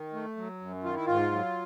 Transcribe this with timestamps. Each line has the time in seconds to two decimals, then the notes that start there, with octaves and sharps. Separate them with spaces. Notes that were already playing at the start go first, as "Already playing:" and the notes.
Already playing: D#3
0.13 A3
0.37 F#3
0.61 F#2
0.84 D#3 F4
0.95 E4
1.06 G#2 F4
1.32 F#3